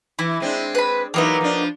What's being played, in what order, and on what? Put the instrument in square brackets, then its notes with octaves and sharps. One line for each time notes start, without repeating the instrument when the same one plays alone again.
[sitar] E3 [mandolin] E4
[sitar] G#3 C4 D4
[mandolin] B4 B5
[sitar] E3 F#3 E4 [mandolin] A#3 B3 D#4
[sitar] F3 D4